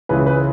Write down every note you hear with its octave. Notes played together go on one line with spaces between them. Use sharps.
C#2 C#3 E3 B4
B4